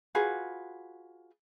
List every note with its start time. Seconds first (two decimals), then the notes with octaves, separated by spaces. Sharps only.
0.15 F4 F#4 G#4 B4